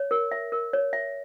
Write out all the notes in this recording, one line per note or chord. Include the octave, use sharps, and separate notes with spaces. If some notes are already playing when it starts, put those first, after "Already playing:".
Already playing: C#5
A#4
E5
A#4
C#5
E5